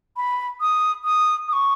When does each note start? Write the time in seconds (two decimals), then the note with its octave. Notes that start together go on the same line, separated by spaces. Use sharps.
0.17 B5
0.61 D#6
1.05 D#6
1.48 D#6
1.53 C#6